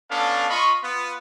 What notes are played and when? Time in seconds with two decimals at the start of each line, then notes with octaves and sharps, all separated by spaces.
0.11 B3 C#4 D4 A4 F5
0.50 F4 D#5 B5 C#6
0.83 B3 F4